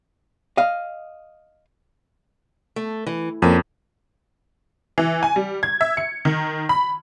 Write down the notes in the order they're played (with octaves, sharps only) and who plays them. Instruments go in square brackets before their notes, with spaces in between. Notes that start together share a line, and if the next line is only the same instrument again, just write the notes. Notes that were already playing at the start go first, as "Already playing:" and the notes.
[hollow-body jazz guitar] D#5 F5
[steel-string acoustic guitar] A3
E3
[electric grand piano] F2 [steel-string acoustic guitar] A#3 C#4
[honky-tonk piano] E3
G#5
G3
G#6
E5
C#7
D#3
B5